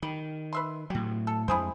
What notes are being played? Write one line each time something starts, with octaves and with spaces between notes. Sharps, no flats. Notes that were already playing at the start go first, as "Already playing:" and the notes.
D#3 G3
B4 E5 C6
A2 F#3 G4
A4
F2 G#3 E4 G#4 C5